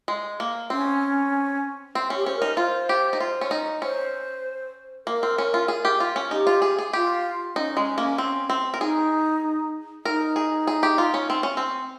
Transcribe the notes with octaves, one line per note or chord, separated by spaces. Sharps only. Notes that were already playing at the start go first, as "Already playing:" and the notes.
G#3
A#3
C4 C#4
C4
C#4
G4
C#4 C5
D#4 A#4
F4 C5
G4
D#4
F4
C#4
D#4
C#4 C5
A#3 A#4
C4
C#4
F4
G#4
G4
F4
C#4
D#4 G4
F4
G#4
G#4
F4 G4
C#4 D#4
G#3
A#3
C4
C4
A#4
D#4 G#4
D#4 A#4
G#4
G#4
G4
F4
C#4
C4
C#4
C4